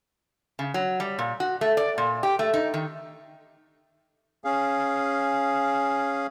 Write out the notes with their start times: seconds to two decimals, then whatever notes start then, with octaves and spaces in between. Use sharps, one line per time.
0.59 C#3
0.74 F#3
1.00 G3
1.19 A#2
1.40 F#4
1.61 A3
1.77 D5
1.98 A#2
2.23 G4
2.39 A3
2.54 D#4
2.74 D#3
4.44 C#4 G#4 F5